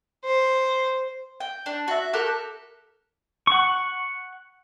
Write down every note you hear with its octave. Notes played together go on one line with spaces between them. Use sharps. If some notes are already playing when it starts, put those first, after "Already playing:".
C5
G5
D4
F#4 E5
G4 A4 A#4 F#6
F#5 C#6